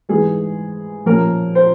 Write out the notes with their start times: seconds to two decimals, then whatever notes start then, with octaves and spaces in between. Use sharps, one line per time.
0.09 G#2 E3 G#3 G#4
1.06 A#2 F3 A#3 C#4 A#4
1.55 C5